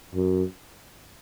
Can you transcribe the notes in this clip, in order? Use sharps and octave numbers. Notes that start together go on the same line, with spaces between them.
F#2